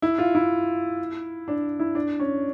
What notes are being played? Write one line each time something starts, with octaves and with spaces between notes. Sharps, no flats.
E4
F4
E4
D4
E4
D4
C#4